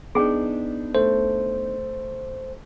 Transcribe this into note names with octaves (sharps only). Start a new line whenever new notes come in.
B3 D4 D#4 G#4 G5
A3 C5